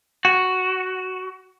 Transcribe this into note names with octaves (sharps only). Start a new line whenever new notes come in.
F#4